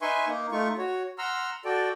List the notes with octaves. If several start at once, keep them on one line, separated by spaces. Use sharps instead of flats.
D#4 B4 E5 G#5 C6 C#6
A#3 D#4
A3 D#4 F4 C#6
F#4 C#5
F#5 A#5 C6 E6 F6
F#4 A4 D5 G5